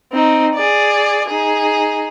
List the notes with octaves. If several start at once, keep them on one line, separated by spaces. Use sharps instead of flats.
C4 D#4
G#4 D5
D#4 G#4